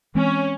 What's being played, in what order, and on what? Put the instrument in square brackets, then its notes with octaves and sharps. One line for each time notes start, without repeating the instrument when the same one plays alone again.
[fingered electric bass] E3 G#3 C4 [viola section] C#4